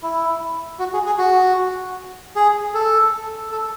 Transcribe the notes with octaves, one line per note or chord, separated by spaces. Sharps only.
E4
F#4
G#4
G#4
F#4
G#4
A4
A4